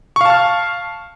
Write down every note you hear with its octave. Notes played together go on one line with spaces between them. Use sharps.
F5 A5 C#6 F6